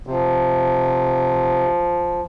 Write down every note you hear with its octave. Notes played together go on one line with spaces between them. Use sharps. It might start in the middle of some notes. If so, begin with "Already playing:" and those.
C3 F3